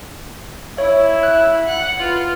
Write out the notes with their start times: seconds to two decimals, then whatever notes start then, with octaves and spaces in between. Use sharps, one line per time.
0.78 E4 C#5 E5
1.23 F#6
1.66 F#5
2.00 F4 B4